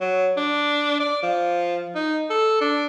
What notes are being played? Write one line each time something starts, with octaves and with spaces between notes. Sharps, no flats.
F#3
D4
D5
F3
D#4
A4
D4